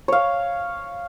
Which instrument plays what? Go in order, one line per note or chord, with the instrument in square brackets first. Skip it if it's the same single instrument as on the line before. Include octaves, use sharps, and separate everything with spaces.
[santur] C#5 F5